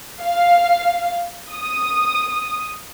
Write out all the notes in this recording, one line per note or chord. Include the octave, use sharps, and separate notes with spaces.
F5
D#6